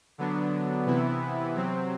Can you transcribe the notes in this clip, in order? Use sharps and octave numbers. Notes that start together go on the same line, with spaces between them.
D3 F#3 B3 D4
C3 E3 B3 E4
C3 F#3 C4